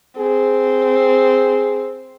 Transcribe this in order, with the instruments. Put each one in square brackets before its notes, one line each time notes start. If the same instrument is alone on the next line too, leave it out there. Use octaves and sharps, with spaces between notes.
[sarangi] C4 [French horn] G#4